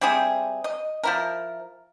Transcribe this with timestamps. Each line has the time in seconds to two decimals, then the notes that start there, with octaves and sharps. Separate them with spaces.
0.01 G3 C4 E4 G#4
0.64 D#5
1.04 F3 E4 A#4